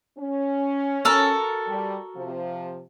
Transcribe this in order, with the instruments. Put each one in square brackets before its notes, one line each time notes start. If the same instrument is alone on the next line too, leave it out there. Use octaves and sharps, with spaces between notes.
[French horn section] C#4
[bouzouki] F#4 A4 A#4
[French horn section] G3
C3 F3